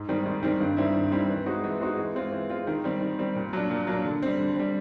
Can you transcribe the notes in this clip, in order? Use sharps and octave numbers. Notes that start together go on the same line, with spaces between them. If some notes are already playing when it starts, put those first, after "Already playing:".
Already playing: G#2
D#3 G3 C4
G#2
D#3 G3 C4
G2
D#3 G3 C4 E4
G2
D#3 G3 C4 E4
E3
G#3 C4 D#4 F#4
E3
G#3 C4 D#4 F#4
E3
G#3 C4 F4
E3
G#3 C4 F4
D#3
G3 C4
D#3
G3 C4
A#2
F#3 A#3 D4
A#2
F#3 A#3 D4
D3
G3 C4
D3
G3 C4